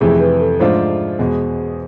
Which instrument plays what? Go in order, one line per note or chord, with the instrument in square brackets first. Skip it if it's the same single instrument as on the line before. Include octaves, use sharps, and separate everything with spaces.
[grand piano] F2 C3 E3 A3 C4 [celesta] G#4
[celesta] B4
A4
[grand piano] G#2 F3 A3 D4 F4 [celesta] C5
[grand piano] E2 B2 G#3